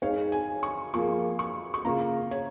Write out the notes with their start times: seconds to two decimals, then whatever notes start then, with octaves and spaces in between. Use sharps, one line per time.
0.02 G#3 D#4 G#4 C#5 F5
0.32 G#5
0.63 C#6
0.93 F3 A#3 F4 G#4 C#6
1.39 C#6
1.74 C#6
1.85 C#3 A#3 F4 A#4 A#5
2.31 C#5